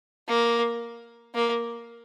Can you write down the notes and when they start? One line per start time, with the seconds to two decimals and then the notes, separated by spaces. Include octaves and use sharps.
0.28 A#3
1.35 A#3